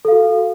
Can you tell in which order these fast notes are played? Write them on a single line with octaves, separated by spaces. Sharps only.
A4 F5 F#4